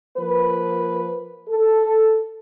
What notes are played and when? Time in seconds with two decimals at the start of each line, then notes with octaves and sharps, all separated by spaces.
0.17 F3 A#3 B4
1.48 A4